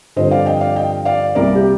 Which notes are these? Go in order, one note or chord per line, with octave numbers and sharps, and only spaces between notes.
G2 D3 F3 C4 C5 D#5
D5 F5
D#5 G5
D5 F5
D#5 G5
D5 F5
C2 C3 G3 A#3 A#4 D5
G4